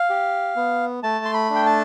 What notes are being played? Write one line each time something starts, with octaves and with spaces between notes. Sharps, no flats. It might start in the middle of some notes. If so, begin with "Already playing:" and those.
Already playing: F5
G4
B3
A3 A5
C6
B5
D4
G5
A5